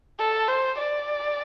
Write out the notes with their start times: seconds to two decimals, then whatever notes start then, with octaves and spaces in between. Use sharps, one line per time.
0.19 A4
0.48 C5
0.78 D5